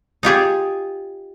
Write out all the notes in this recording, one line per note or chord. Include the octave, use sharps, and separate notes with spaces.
D#4 F4 G4 G#4